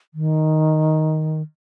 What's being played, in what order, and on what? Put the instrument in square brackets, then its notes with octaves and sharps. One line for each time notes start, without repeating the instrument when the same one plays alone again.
[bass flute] D#3